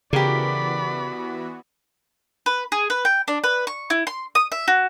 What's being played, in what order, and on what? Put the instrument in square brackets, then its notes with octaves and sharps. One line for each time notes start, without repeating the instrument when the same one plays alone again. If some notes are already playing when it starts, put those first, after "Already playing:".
[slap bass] C#3 [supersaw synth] E3 B3 F#4 [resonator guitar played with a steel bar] G4 A#4 [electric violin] D5 B5
[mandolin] B4
G#4
B4
G5
D4
B4
C#6
E4
C6
D#6
E5
F#4